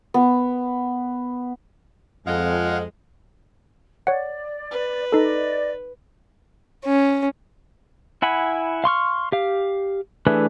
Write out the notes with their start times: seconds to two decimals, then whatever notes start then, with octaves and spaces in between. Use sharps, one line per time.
0.14 B3
2.26 F2 G#3 F5 F#5
4.07 C#5 D5 F#5
4.71 B4
5.12 D#4 A4 D5 D#5
6.86 C#4
8.22 E4 F#5 G#5 B5
8.84 F5 C6 C#6 F6
9.32 G4 F5
10.27 E3 A3 D4 G#4 B4